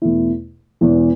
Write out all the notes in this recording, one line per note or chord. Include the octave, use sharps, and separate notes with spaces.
E2 B2 A3 E4
E1 E2 E3